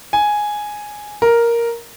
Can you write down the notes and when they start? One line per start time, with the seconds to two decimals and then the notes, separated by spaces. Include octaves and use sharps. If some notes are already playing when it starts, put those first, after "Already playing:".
0.13 G#5
1.22 A#4